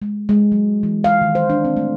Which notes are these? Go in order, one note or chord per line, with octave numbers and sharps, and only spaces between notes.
G#3
G#3
F#3
E3
F5
D#3
C5
D4
C4
A3